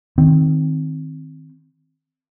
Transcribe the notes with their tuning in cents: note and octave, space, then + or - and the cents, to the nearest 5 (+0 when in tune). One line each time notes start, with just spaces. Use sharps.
D#3 +0 C4 +0